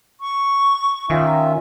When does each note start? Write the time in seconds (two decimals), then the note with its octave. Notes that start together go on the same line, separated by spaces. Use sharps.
0.21 C#6
1.10 D#3 C#4 F4 E5